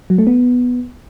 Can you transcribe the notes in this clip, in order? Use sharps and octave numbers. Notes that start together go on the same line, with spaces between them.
F#3
A3
B3